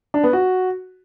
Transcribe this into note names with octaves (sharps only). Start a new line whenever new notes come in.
D4
B3
F#4